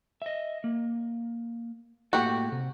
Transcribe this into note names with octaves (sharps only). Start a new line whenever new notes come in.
D#5 E5
A#3
A2 A#3 F#4 G4 A4
C3